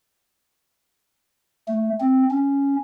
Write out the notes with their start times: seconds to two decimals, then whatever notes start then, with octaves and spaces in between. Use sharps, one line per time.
1.68 A3
2.00 C4
2.30 C#4